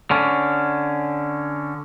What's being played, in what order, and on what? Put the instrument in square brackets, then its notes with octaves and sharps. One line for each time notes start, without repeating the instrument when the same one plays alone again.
[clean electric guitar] D3 C#4